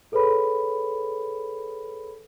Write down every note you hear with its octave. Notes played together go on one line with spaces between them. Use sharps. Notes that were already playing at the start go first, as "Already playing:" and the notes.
G#4 A4 B4 C#5 B5